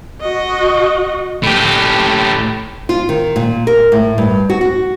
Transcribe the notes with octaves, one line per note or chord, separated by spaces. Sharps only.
F#4 D#5
A2 G4
F4
D#3
A#2
A#4
A2
G2
F#4
F#4